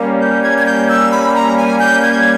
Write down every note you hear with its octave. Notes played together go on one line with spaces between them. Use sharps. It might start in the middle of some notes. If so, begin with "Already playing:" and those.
Already playing: G3 A#3 C#4
G6
G#6
G#6
G6
E6
B5
A#5
G#5
G6
G#6